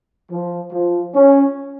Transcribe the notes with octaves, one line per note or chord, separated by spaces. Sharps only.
F3
F3
C#4